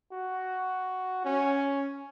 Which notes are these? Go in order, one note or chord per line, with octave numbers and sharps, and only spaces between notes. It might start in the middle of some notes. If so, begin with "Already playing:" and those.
F#4
C#4